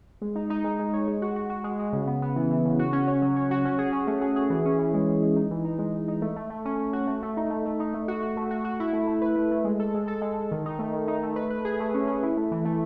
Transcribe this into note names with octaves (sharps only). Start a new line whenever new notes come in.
G#3
D#4
D#4
G#3
G#3
C#5
G#3
F#4
F#4
F#4
G#3
G#3
C#3
B3
B3
E3
E3
C#3
F#4
C#4
C#5
F#3
C#5
F#4
C#4
G#4
C#4
A3
G#4
G#4
E3
C#4
E3
G#3
G#3
G#3
D#4
E3
D#4
G#3
G#3
D#4
A3
A3
A3
C#4
C#4
F#4
A3
A3
D#4
A3
A3
D#4
A3
F#4
F#4
A3
F#4
F#4
E4
A3
A3
B4
A3
A3
G#3
A4
G#3
A4
G#3
G#3
D#3
D#4
A3
D#3
D#4
A3
B4
B4
G#4
A3
C#4
C#4
E4
A3
E3
A3